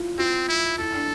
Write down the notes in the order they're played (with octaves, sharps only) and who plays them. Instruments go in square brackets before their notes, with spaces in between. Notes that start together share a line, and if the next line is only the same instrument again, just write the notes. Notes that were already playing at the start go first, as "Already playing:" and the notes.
Already playing: [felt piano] E4 F4
[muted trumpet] C4 [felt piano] F4
[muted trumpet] E4
[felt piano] E4 [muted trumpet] A4
[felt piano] D4